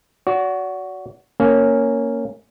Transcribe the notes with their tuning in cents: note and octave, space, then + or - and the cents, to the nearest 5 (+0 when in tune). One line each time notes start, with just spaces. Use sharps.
F#4 +0 D5 -40
A#3 -10 C#4 +0